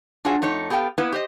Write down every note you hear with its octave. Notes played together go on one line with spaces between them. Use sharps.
D4 F4 F#4 G#4 C#5 E5
F2 A3 D#4 C#5
B3 G4 A4 F5 G5
A#3 B3 E4 B4
G4 C5 D#5